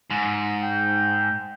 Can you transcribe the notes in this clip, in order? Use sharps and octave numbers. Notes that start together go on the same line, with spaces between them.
G#2
G5